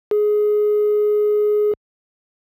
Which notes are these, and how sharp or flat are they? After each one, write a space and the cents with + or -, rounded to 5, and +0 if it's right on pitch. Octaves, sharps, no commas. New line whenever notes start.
G#4 +15